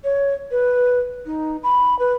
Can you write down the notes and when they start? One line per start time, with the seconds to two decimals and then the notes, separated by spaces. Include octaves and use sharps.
0.04 C#5
0.51 B4
1.26 D#4
1.63 B5
1.99 B4